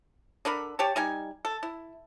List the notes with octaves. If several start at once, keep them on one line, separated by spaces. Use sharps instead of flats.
D3 D4 A#4 B5
G4 C#5 A5
G3 D#4 G#5
A4
E4